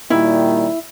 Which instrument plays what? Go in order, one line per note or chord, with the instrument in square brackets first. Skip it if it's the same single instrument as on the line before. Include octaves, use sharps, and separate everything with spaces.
[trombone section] A#2 D#3 G3 [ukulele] E4